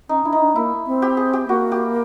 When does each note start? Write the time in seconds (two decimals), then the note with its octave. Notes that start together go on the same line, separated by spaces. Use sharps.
0.09 C#4 D#4
0.25 D4 E4
0.33 D#4
0.40 D4
0.56 A#3 E4
0.87 C4
1.02 G4
1.17 G#4
1.33 G4
1.48 A#3 F#4
1.72 G4